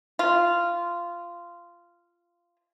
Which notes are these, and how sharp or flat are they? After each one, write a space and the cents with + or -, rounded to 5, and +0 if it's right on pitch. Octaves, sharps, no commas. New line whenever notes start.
F4 -15